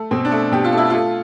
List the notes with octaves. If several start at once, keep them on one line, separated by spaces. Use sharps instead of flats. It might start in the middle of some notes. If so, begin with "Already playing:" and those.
Already playing: A3
B2 C4
D4
A3
B2 G4
F4
A3
E4
A3 F4